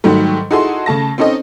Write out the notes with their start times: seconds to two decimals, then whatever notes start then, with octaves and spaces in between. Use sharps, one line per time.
0.04 G#2 D#3 F#3 G3 A3
0.51 D#4 E4 F#4 G#4 A4 C6
0.86 C#3 A3 A5 A#6
1.18 C4 C#4 D#4 A4 D#5